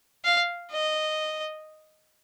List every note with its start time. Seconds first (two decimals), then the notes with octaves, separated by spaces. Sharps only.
0.24 F5
0.71 D#5